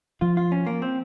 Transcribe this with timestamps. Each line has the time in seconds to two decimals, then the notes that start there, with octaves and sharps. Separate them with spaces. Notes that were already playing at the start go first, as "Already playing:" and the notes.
0.21 F3 F4
0.37 F4
0.52 C#4
0.67 A#3
0.82 C4